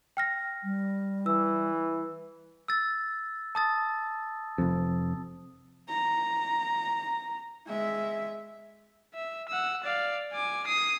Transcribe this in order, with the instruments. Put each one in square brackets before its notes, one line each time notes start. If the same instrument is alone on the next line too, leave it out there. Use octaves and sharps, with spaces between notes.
[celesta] G5 F6 A#6
[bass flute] G3
[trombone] E3 [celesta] E6
[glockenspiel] E6 A6
A5 D#6 A6
[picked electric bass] F1 F2
[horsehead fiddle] A#5
G#3 E5
[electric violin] E5
F#5 E6
D5 F5
G#5 D6
D#6 C7